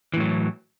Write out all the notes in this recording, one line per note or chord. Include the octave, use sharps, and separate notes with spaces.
A2 E3 F#3